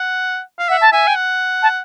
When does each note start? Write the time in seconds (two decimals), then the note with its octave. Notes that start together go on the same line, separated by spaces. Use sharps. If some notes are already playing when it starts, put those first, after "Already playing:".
Already playing: F#5
0.59 F5
0.69 E5 F#5
0.81 A5
0.92 E5 G#5
1.07 G5
1.15 F#5
1.62 A5